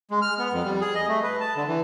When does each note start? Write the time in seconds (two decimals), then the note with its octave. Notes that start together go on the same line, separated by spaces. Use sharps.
0.11 G#3
0.22 F6
0.39 B3
0.52 F2
0.65 G3
0.81 G#4
0.95 D#5
1.08 A3
1.23 B4
1.40 A5
1.56 D3
1.68 E3